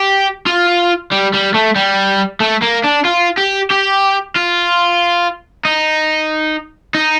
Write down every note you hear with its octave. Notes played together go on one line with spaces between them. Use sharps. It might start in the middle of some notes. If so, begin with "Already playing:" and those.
Already playing: G4
F4
G3
G3
A3
G3
A3
A#3
D4
F4
G4
G4
F4
D#4
D#4